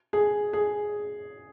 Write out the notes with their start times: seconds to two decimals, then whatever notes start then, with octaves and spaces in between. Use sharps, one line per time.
0.13 G#4
0.53 G#4